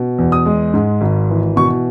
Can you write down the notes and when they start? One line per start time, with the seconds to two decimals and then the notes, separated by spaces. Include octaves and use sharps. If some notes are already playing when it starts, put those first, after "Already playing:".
Already playing: B2
0.18 E2
0.32 D#6
0.46 G#3
0.74 G#2
1.01 G#1
1.30 E3
1.56 B2 C#6